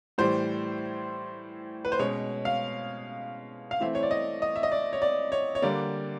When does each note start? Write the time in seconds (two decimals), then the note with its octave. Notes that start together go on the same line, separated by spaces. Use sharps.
0.18 A2 E3 G3 C5
1.85 B4
1.92 C5
1.99 B2 G#3 C#4 C#5
2.45 F5
3.71 F5
3.81 E3 A3 C4 E5
3.95 C#5
4.03 D5
4.11 D#5
4.42 D#5
4.56 E5
4.63 D#5
4.72 D5
4.93 C#5
5.02 D5
5.32 C#5
5.55 C#5
5.62 D3 G3 A#3 D5